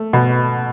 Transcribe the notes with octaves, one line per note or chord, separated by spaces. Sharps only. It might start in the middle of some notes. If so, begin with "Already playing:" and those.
Already playing: A3
B2